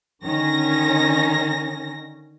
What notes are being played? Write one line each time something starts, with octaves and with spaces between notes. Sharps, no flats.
D3 D#3 C#4 A#6